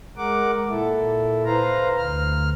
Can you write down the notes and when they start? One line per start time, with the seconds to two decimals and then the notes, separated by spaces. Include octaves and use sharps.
0.17 G#3 A#4 F#5 D6
0.69 A#2 E4 A4
1.45 B4 C5 F5 A#5
1.97 D2 F6